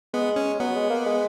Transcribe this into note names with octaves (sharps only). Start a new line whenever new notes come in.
G#3 B3
C#4
F#3 B3
G#3
A#3
G#3